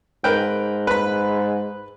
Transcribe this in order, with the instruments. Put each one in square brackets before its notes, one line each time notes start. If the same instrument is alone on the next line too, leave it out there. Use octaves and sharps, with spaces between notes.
[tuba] G#2 [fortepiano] A#4 B4 G5
[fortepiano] B4 B5